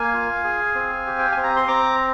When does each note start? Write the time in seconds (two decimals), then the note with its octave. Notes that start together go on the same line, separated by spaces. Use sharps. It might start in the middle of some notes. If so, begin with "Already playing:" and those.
Already playing: A#3 F5 G#5
0.13 F4
0.44 G#4
0.75 C4
1.06 G4
1.19 G5
1.32 G#5
1.37 C4
1.43 A#5
1.56 C6
1.68 C4 A#5 D6